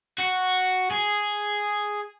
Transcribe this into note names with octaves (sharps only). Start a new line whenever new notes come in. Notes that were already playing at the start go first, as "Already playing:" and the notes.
F#4
G#4